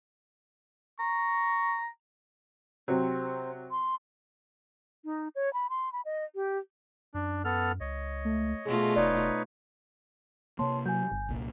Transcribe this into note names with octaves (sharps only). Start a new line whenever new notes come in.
A#5 C#6
C3 F#3 C4
C6
D#4
C#5
B5
C6
B5
D#5
G4
F#2 D4
B3 A4 F6
C#2 C#5 D#5
A3
B2 A3 F4 G#4
E1 D#4 B4 C#5 D5
C3 A#3 C#5 A5 C6
F#3 G#5 G6
G1
C2 A#2